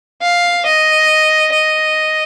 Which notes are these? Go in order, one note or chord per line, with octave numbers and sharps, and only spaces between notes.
F5
D#5
D#5